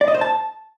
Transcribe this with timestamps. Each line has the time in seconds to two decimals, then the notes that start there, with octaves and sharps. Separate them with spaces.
0.01 D5
0.08 D#5
0.15 C5
0.21 A5